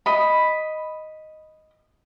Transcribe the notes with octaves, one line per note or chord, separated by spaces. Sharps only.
D#5 B5